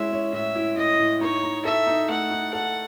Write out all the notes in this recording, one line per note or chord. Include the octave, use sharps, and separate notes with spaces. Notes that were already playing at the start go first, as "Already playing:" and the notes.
Already playing: G#3 C#4 E4 E5
C#4
A2 E5
E4
A2 D#5
A2
D#4 C#5
D#4
A4 E5
D#4
A3 F#5
D#4
A4 F#5